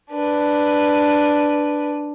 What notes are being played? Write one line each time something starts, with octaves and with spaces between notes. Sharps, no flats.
D4 B4